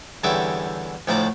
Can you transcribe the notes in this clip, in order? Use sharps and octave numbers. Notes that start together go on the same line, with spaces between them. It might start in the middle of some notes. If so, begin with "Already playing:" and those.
E2 D3 G3 C#4 E5 D6
D2 A2 F3 D4 A#5 D6